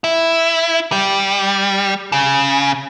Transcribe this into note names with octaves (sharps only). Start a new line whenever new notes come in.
E4
G3
C#3